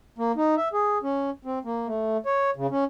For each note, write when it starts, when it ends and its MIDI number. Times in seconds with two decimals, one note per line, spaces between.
0.18 0.32 58
0.37 0.55 63
0.57 0.69 76
0.73 0.98 68
1.03 1.30 61
1.45 1.59 60
1.65 1.87 58
1.87 2.17 57
2.26 2.50 73
2.56 2.67 49
2.71 2.84 61